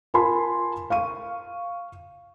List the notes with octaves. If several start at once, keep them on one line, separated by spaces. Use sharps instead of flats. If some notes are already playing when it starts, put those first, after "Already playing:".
F4 A#4 G#5 A5 B5 C6
F5 C#6 D#7